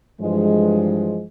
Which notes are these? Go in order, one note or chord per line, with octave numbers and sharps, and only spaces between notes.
G2 E3 F3 G#3